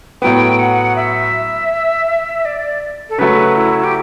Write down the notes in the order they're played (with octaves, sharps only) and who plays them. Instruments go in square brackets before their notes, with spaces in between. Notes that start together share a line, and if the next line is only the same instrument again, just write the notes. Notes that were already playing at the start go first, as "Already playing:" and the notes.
[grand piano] A2 F#3 B3 [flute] G5
[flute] F#5
E5
D5
A4
[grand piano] C#3 F#3 A3 [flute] B4
[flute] E4
G4